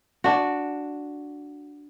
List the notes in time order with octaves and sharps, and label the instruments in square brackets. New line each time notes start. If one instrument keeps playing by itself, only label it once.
[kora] D4 F#4